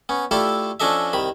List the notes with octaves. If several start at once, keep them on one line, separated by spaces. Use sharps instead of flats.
B3 C#4
A3 E4 F4 G4 A4 D5
F3 C#4 D4 A4 D#5 E5
C2 D#3 B5